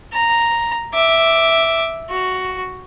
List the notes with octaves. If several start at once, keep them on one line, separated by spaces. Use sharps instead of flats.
A#5
E5 D6
F#4